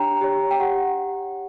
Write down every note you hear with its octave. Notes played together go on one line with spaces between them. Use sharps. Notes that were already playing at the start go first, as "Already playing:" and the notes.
Already playing: D4 G4 C#5 G5 A#5
G4 C#5
G5
G4 F#5